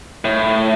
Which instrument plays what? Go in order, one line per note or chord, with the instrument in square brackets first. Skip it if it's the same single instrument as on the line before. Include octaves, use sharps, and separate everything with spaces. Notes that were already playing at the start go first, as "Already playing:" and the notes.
[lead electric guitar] A2